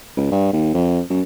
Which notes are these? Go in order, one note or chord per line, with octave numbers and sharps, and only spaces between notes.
C#2
G2
D#2
F2
F#2